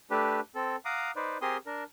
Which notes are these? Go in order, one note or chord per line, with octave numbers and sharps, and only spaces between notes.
A3 D4 G4 B4
C4 A4
F5 F#5 A#5 D6 D#6
D#4 B4 C5 D5
C4 G4 G#4 A#4 C6 D#6
D4 A#4